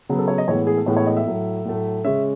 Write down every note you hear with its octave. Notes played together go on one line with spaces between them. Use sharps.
C#3 F#3 B3
A4
C#5
D#5
A2 E3 G#3 B3 C#5
G#4
A4
A2 E3 G#3 B3 C#5
C#5
D#5
E5
A2 F#3 A3
A2 F#3 A3
C#3 G#3 C#4 E5